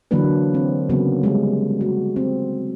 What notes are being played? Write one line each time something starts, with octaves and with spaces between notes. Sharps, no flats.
D3 E3 F#3 A#3 D4 B4
C4
C#3 F#3 A#3 B3 C#4
G3 G#3
F#4
C4